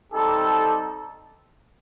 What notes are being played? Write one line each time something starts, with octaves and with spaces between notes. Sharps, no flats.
G3 C4 D#4 G4 A4